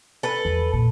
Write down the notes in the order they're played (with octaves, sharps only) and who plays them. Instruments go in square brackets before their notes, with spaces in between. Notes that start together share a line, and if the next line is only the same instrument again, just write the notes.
[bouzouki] A4 B4
[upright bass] E2
A#2